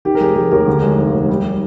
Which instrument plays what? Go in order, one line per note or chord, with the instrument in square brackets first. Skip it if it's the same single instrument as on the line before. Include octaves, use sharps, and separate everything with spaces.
[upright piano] D#3 [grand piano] G4
[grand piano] A#4
[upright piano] F1 [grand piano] G#4
[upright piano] F1 [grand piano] G4
[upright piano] D#2 [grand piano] A#4
[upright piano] D3
G#3
F1
D#2
G3